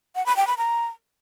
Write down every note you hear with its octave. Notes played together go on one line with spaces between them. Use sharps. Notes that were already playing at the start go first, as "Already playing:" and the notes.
F#5
B5
G5
B5
A#5